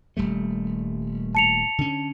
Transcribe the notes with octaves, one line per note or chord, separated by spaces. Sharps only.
D#1 G3 A3
A5 C#7 F7
D3 C#4